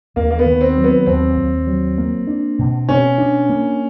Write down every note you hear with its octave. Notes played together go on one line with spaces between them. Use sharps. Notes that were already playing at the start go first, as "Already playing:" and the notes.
D#2 A#3
A#3
B3
D#3
C4
F#3
B3
D#2 C4
D#2
F#3
A#3
D4
B2
B2 C#4
D4
A#3